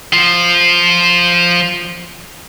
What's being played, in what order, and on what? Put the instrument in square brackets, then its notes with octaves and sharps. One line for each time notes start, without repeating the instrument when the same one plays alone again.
[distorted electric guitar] F3 F4